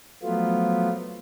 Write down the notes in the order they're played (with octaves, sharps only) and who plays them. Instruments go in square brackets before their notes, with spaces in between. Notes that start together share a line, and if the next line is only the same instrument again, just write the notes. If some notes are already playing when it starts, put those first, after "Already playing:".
[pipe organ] F3 F#3 A3 B3 F4